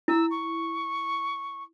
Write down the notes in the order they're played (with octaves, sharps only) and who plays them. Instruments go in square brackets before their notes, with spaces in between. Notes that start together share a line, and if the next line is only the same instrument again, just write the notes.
[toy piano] E4 [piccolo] E6
[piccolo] C#6